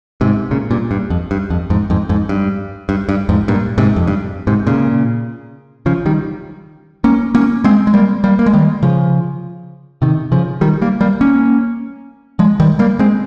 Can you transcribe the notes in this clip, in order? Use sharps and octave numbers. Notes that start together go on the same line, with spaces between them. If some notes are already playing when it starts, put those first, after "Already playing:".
G#2 C3
A#2 C#3
G2 A#2
G2
F2
G2
F2
F2 G#2
F2 G#2
F2 G#2
G2
G2
G2
F2 G#2
G2 A#2
G#2 C3
F2
G2
G#2 C3
A#2 C#3
C#3 F3
D#3 G3
A#3 C#4
A#3 C#4
G#3 C4
G#3
G3 A#3
G3 A#3
A#3
G#3
D#3 G3
C#3 F3
C3 D#3
C#3 F3
D#3 G3
G3 A#3
G3 A#3
A#3 C#4
F3 G#3
D#3 G3
G3 A#3
G#3 C4